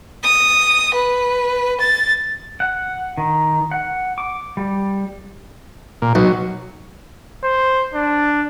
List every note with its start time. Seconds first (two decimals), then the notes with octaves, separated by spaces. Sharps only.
0.23 D#6
0.94 B4
1.79 A6
2.60 F#5
3.18 D#3
3.71 F#5
4.18 D6
4.57 G3
6.02 A#2
6.15 B1 F#3
7.44 C5
7.94 D4